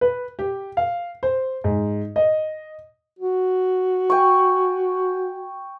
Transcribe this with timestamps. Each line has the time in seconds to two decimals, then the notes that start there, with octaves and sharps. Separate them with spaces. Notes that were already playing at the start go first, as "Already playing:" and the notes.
0.01 B4
0.39 G4
0.77 F5
1.23 C5
1.64 G#2
2.16 D#5
3.19 F#4
4.10 G5 G#5 C#6